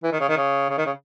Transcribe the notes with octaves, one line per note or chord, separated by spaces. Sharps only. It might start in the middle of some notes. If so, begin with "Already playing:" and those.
E3
D#3
C#3
D#3
C#3
C#3
D#3
C#3